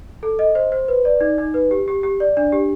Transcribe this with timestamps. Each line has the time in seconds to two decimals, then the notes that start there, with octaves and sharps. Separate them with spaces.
0.23 A4
0.39 D#5
0.55 C5
0.72 C5
0.88 B4
1.05 D5
1.21 D#4
1.38 D#4
1.54 B4
1.71 G4
1.88 G4
2.03 G4
2.20 D5
2.37 D4
2.52 G4